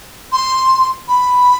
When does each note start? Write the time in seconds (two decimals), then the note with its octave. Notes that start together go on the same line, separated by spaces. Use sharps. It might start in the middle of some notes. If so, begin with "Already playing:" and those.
0.32 C6
1.08 B5